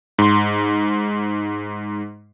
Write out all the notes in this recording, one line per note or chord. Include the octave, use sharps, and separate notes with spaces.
G#2 C6